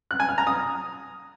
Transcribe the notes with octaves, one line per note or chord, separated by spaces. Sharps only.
F#6
G#5
F6
A#5
D#6